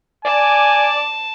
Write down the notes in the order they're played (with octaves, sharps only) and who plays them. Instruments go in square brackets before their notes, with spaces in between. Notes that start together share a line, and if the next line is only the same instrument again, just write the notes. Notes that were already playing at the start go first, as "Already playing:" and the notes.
[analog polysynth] D5 D6 [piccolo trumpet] G#5 [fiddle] A5